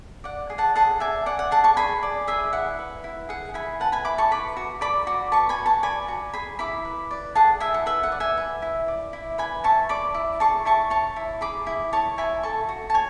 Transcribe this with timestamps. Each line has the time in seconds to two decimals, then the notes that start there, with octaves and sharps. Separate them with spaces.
0.24 D5 F#5
0.50 G#4
0.58 F#5 A5
0.75 G#4 F#5 A5
1.00 D5 E5 G#5
1.26 D5 F#5
1.39 F#5
1.51 G#4 F#5 A5
1.64 A5 C#6
1.77 G#4 G#5 B5
2.03 D5
2.27 G#4 E5 G#5
2.53 E4 F#5
2.79 B4
3.04 E4
3.29 G#4 F#5
3.54 E4 G#5 B5
3.80 B4 F#5 A5
3.92 G#5 B5
4.05 E4 B5 D6
4.18 A5 C#6
4.31 B4 B5 D6
4.57 F#4
4.81 D5 B5 D6
5.07 F#4
5.32 B4 A5 C#6
5.49 G#5 B5
5.58 F#4
5.66 A5 C#6
5.83 D5 G#5 B5
6.08 F#4
6.34 G#4 G#5 B5
6.59 E4 B5 D6
6.85 B4
7.11 D5
7.35 G#4 F#5 A5
7.60 E4 E5 G#5
7.74 F#5
7.86 B4 E5
8.03 F#5
8.12 D5
8.20 E5 G#5
8.37 B4
8.62 E4
8.88 D5
9.13 E4
9.38 B4 G#5 B5
9.64 E4 A5 C#6
9.89 D5 B5 D6
10.14 E4
10.40 G#4 A5 C#6
10.65 E4 A5 C#6
10.90 C#5 A5 C#6
11.16 E4
11.41 G#4 B5 D6
11.67 E4
11.93 C#5 A5 C#6
12.18 E4 G#5 B5
12.43 A4 A5 C#6
12.69 F#4
12.90 A5
12.94 C#5 G#5